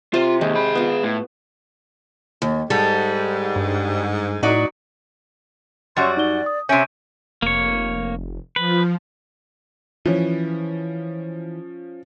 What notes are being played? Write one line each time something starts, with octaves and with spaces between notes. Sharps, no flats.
C3 F4 C5
D#2 G#3
G#4 B5
B3 F4
A2
D#2
G#2 G3 A4
G2
A2 F#3 D#4 F#4 D5
F#2 G3 F#4 C#5 C6 E6 A6
D#4 D5 G7
D#6
C3 C#4 E5 G6 D7 D#7
F1 A#3 C#5
F3 B4
E3 F3 C#4